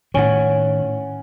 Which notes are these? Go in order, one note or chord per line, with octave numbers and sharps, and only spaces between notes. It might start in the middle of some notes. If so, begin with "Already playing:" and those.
A2 D#3 C#4 F#5